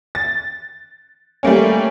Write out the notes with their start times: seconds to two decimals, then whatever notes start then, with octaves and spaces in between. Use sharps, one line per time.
0.15 A6
1.43 G3 A3 A#3 C#4